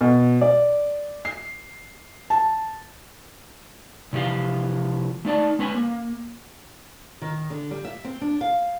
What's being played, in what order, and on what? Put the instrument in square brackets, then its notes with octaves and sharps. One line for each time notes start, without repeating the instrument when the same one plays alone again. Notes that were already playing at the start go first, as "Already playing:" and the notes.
[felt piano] B2
D5
C7
A5
[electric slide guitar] C3 E3 F3 G4 F5
A3 D#4 D5 A5
G#3 C#4 B4 G5 G#5
A#3
[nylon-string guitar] D#3
D3
G3
E5
C4
D4
F5